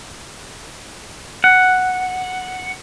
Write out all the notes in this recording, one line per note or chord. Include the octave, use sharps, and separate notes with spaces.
F#5